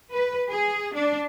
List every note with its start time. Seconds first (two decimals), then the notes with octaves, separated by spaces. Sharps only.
0.12 B4
0.49 G#4
0.94 D4